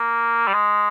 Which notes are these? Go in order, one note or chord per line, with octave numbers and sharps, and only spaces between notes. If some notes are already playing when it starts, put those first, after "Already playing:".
Already playing: A#3
G3
G#3